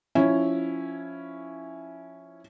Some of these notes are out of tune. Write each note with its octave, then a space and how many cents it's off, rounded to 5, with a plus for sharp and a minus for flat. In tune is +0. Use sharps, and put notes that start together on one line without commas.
F3 +0 C#4 +0 E4 +0